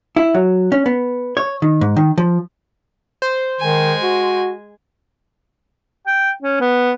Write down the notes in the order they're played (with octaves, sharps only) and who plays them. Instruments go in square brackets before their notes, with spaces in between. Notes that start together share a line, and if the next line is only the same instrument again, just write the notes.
[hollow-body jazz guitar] E4
F#3
C#4
B3
C#5
D#3
G#2
D#3
F3
[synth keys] C5
[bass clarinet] D#3 [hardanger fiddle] G#3 G#5
[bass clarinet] F#4
[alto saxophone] G5
C#4
B3